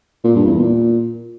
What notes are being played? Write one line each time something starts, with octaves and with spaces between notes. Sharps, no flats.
A#2
G2
E2
A#2